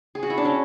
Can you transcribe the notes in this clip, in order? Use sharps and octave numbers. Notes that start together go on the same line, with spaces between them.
G#4
F#4
E4
D4
C#4